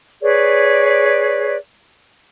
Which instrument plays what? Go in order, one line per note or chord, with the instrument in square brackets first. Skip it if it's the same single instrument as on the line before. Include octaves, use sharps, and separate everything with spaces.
[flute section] G#4 B4 C#5 D5